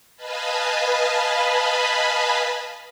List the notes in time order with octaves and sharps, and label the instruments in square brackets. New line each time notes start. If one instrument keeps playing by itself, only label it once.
[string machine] B4 D#5 F5 G#5 A5 B5